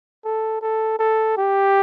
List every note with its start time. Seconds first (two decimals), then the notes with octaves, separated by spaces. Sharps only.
0.25 A4
0.61 A4
0.99 A4
1.37 G4